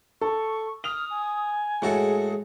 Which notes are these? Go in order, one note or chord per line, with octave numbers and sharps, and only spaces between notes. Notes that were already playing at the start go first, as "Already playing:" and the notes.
A4 C#6
D#6 F6 F7
G#5
A2 G#3 F#4 G#4 A4